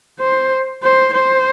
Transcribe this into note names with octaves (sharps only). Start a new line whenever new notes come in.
C5
C5
C5